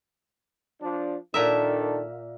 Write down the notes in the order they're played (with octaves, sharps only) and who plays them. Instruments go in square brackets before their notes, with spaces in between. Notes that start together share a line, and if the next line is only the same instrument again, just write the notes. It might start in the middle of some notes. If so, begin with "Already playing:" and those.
[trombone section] F3 D4
[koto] A#2 A#4 E5 [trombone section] D#3 D4 A4